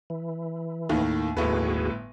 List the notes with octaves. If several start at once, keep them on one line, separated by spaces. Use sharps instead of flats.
E3
D#2 A2 D#3
G1 D#2 A2 F#4 G#4 B4